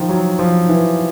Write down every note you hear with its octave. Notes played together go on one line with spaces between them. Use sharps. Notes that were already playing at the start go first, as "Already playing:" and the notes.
Already playing: D#3 F3
F#3
F3
E3